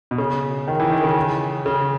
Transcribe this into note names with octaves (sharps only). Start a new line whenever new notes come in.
B2
C#3
D#3
E3
D#3
C#3
C#3